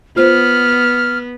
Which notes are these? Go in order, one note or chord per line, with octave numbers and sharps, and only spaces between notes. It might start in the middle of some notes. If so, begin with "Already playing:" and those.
B3 F4 C5 F6